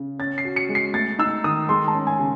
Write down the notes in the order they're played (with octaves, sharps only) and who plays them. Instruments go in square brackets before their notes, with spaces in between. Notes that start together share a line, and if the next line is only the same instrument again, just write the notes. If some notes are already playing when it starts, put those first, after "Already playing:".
Already playing: [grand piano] C#3
[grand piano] C#4 [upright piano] A6
[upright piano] C7
[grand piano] F#4
[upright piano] C#7
[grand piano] G#3
[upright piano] C7
[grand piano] A3 [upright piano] A6
[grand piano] D#4 [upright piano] E6
[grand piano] D#3 [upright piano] D#6
[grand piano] G#3 [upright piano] C6
[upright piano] A5
[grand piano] C#4
[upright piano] G#5
[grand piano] C#3